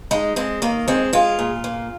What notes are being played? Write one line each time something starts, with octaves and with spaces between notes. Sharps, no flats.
G#3 D#4
G#3 C4
D#3 A#3
G#3 C4
G#3 F4
A#2
A#3